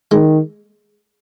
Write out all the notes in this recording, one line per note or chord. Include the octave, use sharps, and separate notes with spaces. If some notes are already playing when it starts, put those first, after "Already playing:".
D#3 G#3